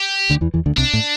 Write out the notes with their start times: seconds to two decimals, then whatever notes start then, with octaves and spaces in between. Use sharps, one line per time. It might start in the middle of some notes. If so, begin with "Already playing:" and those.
Already playing: G4
0.30 D2 D3
0.41 E2 E3
0.54 E2 E3
0.66 D2 D3
0.77 C2 C3 D4
0.93 A2